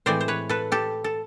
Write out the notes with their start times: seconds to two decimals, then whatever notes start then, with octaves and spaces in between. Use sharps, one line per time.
0.06 A2 E3 G#3 C4 C5 D5
0.21 C5
0.28 B4 C#5
0.49 A4 B4
0.72 G4 A4
1.04 A4